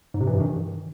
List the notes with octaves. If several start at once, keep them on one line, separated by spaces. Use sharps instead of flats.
G#2
C3
E3
G2
D#3